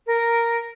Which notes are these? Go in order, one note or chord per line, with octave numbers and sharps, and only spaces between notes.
A#4